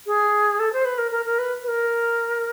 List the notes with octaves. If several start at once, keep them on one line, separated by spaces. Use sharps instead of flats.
G#4
A4
C5
B4
A#4
A#4
A#4
B4
B4
A#4